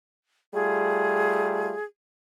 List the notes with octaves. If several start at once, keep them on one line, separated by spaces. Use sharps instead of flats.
G3 A3 F4 G#4